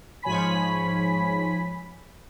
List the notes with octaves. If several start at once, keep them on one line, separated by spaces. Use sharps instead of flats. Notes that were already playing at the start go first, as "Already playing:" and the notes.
G#2 F3 C#5 G#5 B5 B6